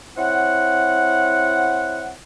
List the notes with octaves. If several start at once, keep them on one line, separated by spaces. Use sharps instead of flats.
C4 E4 C#5 F#5